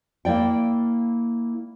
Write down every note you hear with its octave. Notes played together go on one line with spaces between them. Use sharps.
A#3 E4 D5 G5